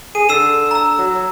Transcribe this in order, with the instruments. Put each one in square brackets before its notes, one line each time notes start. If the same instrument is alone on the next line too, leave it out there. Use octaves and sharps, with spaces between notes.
[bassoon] G#4 [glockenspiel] D#7
[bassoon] D3 [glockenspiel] E6 C7 E7
[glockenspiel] A#5 E6
[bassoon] F#3